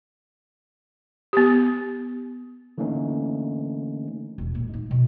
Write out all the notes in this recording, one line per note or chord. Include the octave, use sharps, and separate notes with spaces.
B3 G4
D3 E3 A3 A#3 C#4 D#4
E1
A#2
D#4
B2